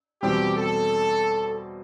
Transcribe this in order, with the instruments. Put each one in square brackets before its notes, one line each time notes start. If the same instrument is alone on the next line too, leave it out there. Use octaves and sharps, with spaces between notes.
[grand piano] E2 B2 G3 C4 [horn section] G4
[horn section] A4